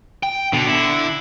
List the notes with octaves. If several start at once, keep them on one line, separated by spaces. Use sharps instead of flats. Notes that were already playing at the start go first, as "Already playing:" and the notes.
G5
B2 D3
E4